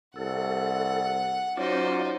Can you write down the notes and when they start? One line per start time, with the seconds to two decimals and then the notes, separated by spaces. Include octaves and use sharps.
0.16 C2 A4 F#5
1.57 F#3 C#4 D#4 F4 C5 D5